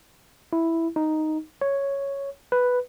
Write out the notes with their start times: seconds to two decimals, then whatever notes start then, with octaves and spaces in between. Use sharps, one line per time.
0.53 E4
0.96 D#4
1.61 C#5
2.52 B4